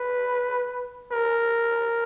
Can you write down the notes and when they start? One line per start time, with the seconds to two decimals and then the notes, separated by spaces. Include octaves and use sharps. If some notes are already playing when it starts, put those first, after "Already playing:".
Already playing: B4
1.11 A#4